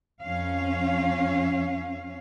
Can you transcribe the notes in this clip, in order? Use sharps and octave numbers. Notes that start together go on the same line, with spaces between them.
F2 C#4 F5